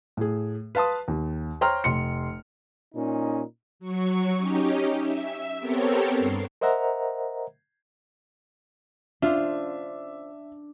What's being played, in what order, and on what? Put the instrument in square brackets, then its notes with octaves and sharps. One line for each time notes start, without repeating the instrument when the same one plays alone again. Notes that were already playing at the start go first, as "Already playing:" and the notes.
[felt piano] A2 G#4
B4 F5 A5 C6 D#6
D#2
C5 C#5 G5 A#5 C6 F6
F1 C6 C#7
[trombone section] A#2 C#4 D#4
[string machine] F#3 C#6
C#4 D#4 G4
E5
B3 C4 G4 A4 A#4 C#5
G2 C7
[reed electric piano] A#4 C5 D#5 E5 F#5 A#5
[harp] D4 [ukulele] F4 C5 F5 [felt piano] E5